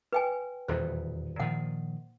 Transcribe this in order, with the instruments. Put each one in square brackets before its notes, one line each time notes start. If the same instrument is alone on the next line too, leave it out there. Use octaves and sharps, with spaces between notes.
[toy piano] B4 G5 G#5
[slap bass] D#1 E2 B2 [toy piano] C5
[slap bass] A#2 D#3 F3 [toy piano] F#5